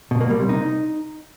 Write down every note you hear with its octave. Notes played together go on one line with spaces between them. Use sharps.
B2
A#3
G3
C3
D#4